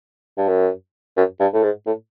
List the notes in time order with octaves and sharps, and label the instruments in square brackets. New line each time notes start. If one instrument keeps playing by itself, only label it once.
[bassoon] G2
F#2
F#2
G2
A2
G#2
A2